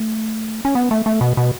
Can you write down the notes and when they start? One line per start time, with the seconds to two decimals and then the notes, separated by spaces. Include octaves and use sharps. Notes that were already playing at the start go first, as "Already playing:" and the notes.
Already playing: A3
0.65 C#4
0.75 B3
0.91 A3
1.06 A3
1.21 B2
1.37 B2